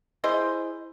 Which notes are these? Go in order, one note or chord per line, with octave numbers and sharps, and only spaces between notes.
E4 G#4 C5 D#5